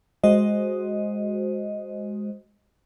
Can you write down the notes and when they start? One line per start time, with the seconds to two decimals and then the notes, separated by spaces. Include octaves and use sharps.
0.24 G#3 F#4 C5 D#5